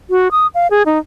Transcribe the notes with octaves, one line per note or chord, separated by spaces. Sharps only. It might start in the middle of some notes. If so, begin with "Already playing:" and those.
F#4
D#6
F5
G#4
D#4